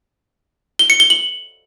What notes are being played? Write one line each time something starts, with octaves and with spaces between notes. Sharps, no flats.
G7
C#7
G7
F#7